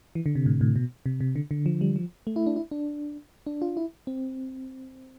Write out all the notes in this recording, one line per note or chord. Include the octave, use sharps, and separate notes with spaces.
E3
D3
C3
A2
A2
B2
C3
C3
D3
D3
F3
G3
F3
A3
E4
D4
E4
D4
D4
F4
E4
C4